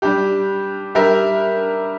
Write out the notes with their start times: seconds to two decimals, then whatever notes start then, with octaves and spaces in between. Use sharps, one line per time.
0.02 G3 D4 G4
0.95 G3 D4 G4 A#4 E5